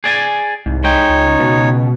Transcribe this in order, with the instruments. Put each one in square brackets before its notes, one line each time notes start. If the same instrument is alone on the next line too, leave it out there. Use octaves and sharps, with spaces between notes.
[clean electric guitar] G#4 D5 G#5
[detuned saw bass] C2 [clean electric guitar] G#2
[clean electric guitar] G#3 G5 [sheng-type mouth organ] D#4 C#5
[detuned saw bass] C#2
[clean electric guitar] C#2 [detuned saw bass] B2